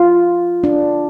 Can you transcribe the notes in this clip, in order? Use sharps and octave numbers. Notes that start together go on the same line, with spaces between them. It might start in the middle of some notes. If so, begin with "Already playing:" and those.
Already playing: F4
D4